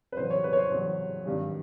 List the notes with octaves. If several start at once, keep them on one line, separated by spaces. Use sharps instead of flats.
B4
E2 C#3 F#3 C5
C#5
B4
C#5
C5
E2 C#3 F#3
G#1 G2 D#3 F#3